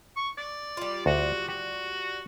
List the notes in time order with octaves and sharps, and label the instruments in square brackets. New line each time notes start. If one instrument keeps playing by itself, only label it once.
[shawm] C#6
D5
[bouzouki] G3 F4
[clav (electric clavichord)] D2 [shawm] F#4
[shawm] F#4 [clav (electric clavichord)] G4